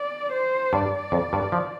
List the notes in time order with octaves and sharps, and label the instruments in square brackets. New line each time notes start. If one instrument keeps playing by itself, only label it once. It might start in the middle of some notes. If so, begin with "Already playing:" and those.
Already playing: [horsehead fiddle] D5
C5
[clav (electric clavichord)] G2 [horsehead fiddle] D5
[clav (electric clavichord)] F2
G2
F3